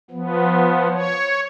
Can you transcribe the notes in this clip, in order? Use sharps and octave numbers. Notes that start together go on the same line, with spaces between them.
F3 B3
C#5